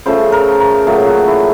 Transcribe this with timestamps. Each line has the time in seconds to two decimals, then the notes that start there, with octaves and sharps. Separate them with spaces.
0.06 C#3 F3 A3 C5
0.32 A#4
0.60 A#4
0.87 A#2 F#3 A3 G#4
1.07 F#4
1.27 E4